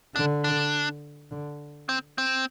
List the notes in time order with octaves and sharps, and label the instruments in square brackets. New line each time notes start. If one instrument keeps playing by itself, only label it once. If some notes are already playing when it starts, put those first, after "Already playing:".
[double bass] D3 [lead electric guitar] D4
[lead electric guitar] D4
[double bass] D3
[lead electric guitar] C4
C4